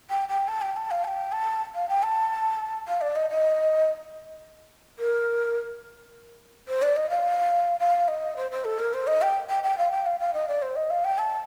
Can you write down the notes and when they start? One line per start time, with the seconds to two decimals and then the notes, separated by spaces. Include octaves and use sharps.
0.10 G5
0.29 G5
0.48 A5
0.61 G5
0.76 A5
0.91 F5
1.04 A5
1.08 G5
1.32 A5
1.75 F5
1.89 G5
2.03 A5
2.88 F5
3.01 D5
3.16 D#5
3.30 D#5
4.99 A#4
6.68 C5
6.82 D5
6.96 D#5
7.10 F5
7.80 F5
8.08 D#5
8.36 C5
8.51 C5
8.65 A4
8.79 A#4
8.94 C5
9.07 D#5
9.22 G5
9.49 G5
9.63 G5
9.78 F5
9.92 G5
10.06 F5
10.20 F5
10.34 D#5
10.48 D5
10.62 C5
10.76 D#5
10.90 F5
11.04 G5
11.18 A5